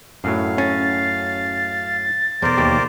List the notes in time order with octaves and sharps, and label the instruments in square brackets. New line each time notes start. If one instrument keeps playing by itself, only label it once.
[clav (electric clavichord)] F#2 A2 F#3 [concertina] F5
[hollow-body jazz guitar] C#4 [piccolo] A6
[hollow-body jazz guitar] B1 E2 [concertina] A#4 C5 D5
[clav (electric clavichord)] D#2 G4